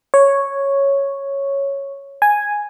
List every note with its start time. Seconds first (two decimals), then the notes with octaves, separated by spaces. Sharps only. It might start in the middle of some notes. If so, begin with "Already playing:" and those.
0.14 C#5
2.22 G#5